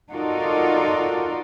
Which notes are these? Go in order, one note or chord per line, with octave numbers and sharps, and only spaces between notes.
D#4 F4 F#4 A4 A#4 D5